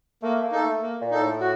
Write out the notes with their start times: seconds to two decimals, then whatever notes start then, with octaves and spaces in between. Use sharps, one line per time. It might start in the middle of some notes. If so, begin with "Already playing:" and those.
0.23 A3 A#3
0.43 A#3
0.52 D#4 A4
0.62 A3
0.82 A#3
1.01 A#2
1.11 D#4 A4
1.21 A2
1.41 F#4